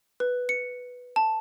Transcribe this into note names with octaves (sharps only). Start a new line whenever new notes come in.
B4
C#7
A5